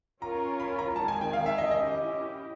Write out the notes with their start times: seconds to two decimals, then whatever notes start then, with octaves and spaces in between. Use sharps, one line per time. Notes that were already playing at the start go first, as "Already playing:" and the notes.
0.22 C#4 F4 A#4 C#5 A#5
0.60 B5
0.79 A#5
0.96 D#3 G#3 C4 A5
1.08 G#5
1.21 G5
1.33 F5
1.46 E5
1.58 D#5
1.71 C#4 E4 G4 D#5